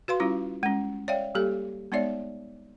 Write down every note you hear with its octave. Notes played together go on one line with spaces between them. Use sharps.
F#4 B4 F5 C6
G3 C#4 E4 F4
G#3 C#4
C#5 D5 E5 F5 G5
G3 A#3 G4 A4
G#3 B3 D#4 C#5 D5 E5